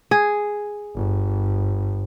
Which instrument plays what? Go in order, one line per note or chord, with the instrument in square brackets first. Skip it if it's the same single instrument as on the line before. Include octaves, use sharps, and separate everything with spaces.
[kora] G#4
[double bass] G1